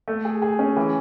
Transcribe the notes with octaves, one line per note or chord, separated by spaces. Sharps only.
A3
G#4
G#4
C#4
E3